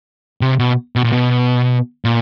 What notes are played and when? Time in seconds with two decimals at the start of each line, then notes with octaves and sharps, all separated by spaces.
0.41 C3
0.59 B2
0.96 B2
1.04 A#2
1.12 B2
2.05 A#2